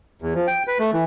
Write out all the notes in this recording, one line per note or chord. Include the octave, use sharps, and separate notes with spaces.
E2
F3
G5
B4
A3
E3